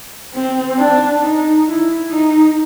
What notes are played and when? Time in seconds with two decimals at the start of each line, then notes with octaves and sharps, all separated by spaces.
0.34 C4
0.78 D4
1.21 D#4
1.66 E4
2.10 D#4